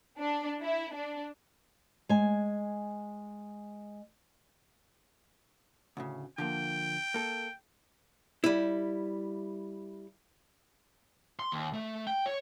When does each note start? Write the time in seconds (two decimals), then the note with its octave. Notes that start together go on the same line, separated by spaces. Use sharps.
0.18 D4
0.61 E4
0.94 D4
2.09 G#3 G#5
5.97 D2 A2 C#3
6.38 D3 F3 A#3 G5
7.14 A#3 A4
8.44 G3 E4
11.39 C6
11.52 D#2
11.73 A3
12.07 G5
12.26 C#5